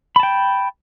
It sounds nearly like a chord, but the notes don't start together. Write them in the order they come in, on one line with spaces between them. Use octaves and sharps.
B5 A5 G5